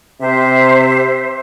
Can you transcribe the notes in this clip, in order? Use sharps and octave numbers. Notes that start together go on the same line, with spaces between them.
C3 C5 E5